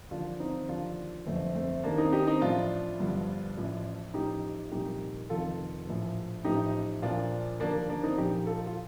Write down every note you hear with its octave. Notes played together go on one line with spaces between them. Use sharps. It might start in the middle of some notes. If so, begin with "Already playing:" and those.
D#2 D3 F3 D4 F4
C4 D#4
D#2 D3 F3 D4 F4
G1 F2 D3 F3 A3 C4
A3 C4
D#2 D#3 A#3 D4
C4 D#4
D#4 G4
C4 D#4
A1 A2 F3 D4 F4
G1 G2 D3 F3
A1 A2 F3
A1 A2 F3 D#4 G4
C2 A#2 F3 D#4 G4
F1 F2 D#3 F4 A4
A#1 A2 F3
A1 A2 F3 D#4 G4
A#1 A#2 F3 D4 F4
D#2 D3 F3 A#3 D4
A#3 D4
C4 D#4
A#1 A#2 F3 D#4 G4
F4 A4
F4